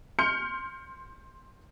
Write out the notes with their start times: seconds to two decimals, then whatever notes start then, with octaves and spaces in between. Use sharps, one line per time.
0.19 C6 F6 G6 C#7